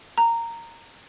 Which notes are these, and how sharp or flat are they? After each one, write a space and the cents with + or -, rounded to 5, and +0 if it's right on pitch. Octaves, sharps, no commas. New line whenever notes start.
A#5 -15